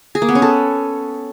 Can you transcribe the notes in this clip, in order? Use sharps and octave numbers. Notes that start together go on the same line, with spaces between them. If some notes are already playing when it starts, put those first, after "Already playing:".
G#4
A#3
B3
C#4
A4